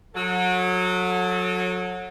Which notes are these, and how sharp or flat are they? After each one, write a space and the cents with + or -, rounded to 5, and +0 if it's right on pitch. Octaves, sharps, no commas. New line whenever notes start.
F#3 -25 A4 +0